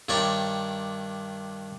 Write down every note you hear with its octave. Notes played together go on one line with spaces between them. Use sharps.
G2 D#3 C#5 D5 G5 A#5